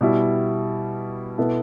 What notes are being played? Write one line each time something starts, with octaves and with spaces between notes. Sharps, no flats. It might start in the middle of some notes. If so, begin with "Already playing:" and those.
B2 G3 E4
B2 B3 E4 A4